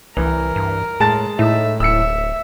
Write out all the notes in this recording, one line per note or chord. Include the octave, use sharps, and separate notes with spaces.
C2 E3 A#4
G2
A2 G#3 A5 A6
A2 D#4 E5
D1 E5 E6 C#7